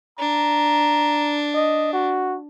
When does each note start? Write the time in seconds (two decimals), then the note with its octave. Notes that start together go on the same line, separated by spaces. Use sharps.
0.19 D4 A#5
1.55 D#5
1.93 F#4